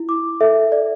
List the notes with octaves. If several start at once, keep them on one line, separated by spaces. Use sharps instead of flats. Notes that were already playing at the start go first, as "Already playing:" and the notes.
Already playing: E4
D6
A4 E5
D5